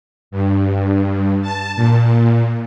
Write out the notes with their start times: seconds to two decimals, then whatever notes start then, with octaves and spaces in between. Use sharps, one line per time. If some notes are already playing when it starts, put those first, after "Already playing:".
0.31 G2
1.42 A5
1.76 A#2